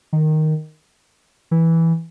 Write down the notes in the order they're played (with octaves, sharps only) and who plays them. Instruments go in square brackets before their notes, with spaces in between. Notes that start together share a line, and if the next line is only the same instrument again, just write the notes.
[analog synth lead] D#3
E3